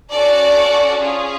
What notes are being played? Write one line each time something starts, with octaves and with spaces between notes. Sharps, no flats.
C#4 F#4 A4 D5
C#4 F4 G#4